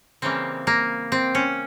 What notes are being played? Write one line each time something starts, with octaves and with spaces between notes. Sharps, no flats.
C#3 E3 G3 A#3 C4
A#3
C4
C#4